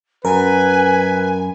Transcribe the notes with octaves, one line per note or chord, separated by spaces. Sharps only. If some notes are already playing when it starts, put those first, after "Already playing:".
F#2 A#4 B4 G#5